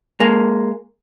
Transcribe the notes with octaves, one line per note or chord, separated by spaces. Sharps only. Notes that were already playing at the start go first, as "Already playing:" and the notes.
G#3 A#3